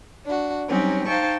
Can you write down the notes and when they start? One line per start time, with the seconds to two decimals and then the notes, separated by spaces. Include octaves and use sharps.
0.25 D4 F#4
0.68 F#3 G3 C4 C#4 D#4 G4
1.07 D#4 C5 F5 G5 A5 C#6